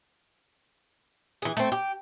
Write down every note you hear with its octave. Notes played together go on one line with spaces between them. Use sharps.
E3 G#4
A3 C4
G4